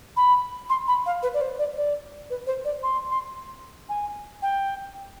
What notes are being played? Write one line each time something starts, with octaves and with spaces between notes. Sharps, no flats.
B5
C6
B5
F5
B4
D5
C5
D5
D5
B4
C5
D5
C6
C6
G#5
G5